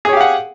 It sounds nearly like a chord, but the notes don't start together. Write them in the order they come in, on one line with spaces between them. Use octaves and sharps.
G#4 C#5 G4 F5 F#5